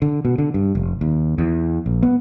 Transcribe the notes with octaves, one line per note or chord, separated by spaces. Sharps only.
D3
B2
D3
G2
F1
D#2
E2
A#1
B3